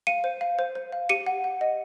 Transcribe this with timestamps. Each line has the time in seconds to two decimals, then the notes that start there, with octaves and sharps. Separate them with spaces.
0.07 F5 C#7 D#7
0.24 C5
0.41 F5
0.59 C5
0.75 C5
0.92 F5
1.09 G4 C#7 D#7
1.26 F#5
1.44 F#5
1.61 D#5